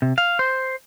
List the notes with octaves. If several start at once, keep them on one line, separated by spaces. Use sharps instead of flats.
C3
F5
C5